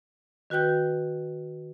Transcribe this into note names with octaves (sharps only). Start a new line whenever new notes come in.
D#3 F#4 B4 G5 G6